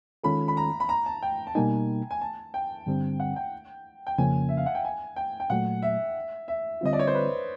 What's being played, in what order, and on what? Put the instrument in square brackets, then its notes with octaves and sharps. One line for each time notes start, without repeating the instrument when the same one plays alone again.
[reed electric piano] D#3 G#3 C#4 F4 A4 [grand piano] B5
[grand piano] B5
A#5
B5
A#5
A5
G5
A5
[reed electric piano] B2 G3 A#3 D#4 [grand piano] G#5
[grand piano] G#5
A5
G5
[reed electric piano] G2 D3 G3 C4
[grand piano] F#5
G5
G5
[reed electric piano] F2 C#3 F3 A#3 C#4 [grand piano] G#5
[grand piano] E5
F5
F#5
G5
G#5
G5
G5
[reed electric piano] A#2 F#3 A3 [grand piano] F#5
[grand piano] E5
E5
[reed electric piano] D3 G3 C4 F4 [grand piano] D#5
[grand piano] D5
C#5
C5
B4